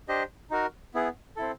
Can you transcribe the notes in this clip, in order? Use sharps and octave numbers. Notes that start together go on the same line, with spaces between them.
D4 G4 C5 D#5
D#4 F#4 A#4
B3 E4 G#4
C4 E4 A4